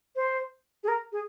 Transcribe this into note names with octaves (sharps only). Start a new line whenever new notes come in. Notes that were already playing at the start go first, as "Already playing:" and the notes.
C5
G#4
A#4
G#4